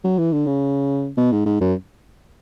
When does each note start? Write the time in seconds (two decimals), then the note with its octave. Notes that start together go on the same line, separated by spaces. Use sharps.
0.04 F#3
0.18 E3
0.32 D3
0.47 C#3
1.17 B2
1.32 G#2
1.46 G#2
1.61 F#2